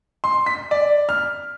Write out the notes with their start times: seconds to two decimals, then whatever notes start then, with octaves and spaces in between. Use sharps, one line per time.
0.24 C6
0.46 B6
0.71 D5
1.09 F6